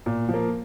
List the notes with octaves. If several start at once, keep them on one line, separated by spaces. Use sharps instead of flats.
A#2
F3
A#3